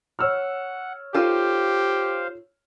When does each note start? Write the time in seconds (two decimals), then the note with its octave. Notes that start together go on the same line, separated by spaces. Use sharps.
0.19 C#5 F#5 E6 F6
1.14 D#4 F4 G4 A4 C5 F5